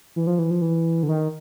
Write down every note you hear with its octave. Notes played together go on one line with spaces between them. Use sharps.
E3
F3
E3
F3
E3
D3
D#3